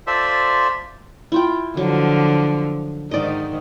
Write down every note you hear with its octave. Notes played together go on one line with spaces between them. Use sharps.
F4 A4 C5 D5 E5
E4 F4 G5
D3 F3 F#3
G#2 D#3 D5 D#5